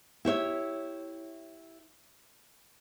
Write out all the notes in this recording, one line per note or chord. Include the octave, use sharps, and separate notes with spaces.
E4 G4 C#5 E5